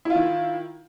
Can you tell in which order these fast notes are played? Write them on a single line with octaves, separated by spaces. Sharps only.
E4 F4 D#3